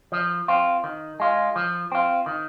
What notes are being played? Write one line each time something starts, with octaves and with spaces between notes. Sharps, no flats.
F3
C4 F4
D#3
G#3 F4
F3
C4 F4
D#3